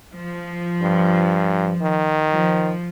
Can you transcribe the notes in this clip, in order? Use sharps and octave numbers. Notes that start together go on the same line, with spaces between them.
F3
G2
D#3
F3